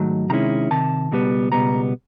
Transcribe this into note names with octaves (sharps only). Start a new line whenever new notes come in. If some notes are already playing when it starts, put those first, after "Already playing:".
Already playing: G#2 D#3 F#3 A3
C3 D#3 G#3 C#4 E4 A#5
C3 D#3 A5
C#2 B2 G3 B3
C#2 B2 G3 B3 A#5